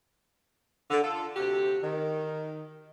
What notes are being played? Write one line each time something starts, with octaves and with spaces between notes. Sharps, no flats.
D3
F4 A4
D2 C3 F#4 G4
D#3